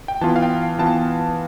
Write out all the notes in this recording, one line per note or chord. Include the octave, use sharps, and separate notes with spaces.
G5
E3 B3 F4 A5
G5
F5
G5
E3 B3 F4 A5